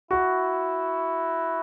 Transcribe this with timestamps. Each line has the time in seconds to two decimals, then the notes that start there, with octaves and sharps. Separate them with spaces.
0.11 E4 F#4